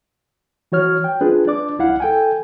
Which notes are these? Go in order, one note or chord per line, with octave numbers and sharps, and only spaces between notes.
E3 F#4 C#5 F6
G5
D4 F4 G#4 B4
D4 D5 D6
C2 E4 F5 F#5
A4 G5 G#5